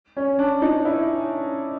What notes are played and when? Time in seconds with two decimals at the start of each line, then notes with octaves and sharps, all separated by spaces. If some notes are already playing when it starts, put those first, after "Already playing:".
0.17 C#4
0.39 D4
0.62 D#4
0.85 E4